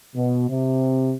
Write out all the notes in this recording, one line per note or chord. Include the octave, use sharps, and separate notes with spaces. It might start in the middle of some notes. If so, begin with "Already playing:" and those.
B2
C3